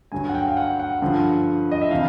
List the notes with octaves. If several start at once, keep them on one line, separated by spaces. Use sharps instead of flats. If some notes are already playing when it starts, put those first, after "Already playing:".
G2 D3 F#3 G#5
F#5
G5
F5
F#5
F#5
G2 D3 F3
D#5
E5
C3 E3 F5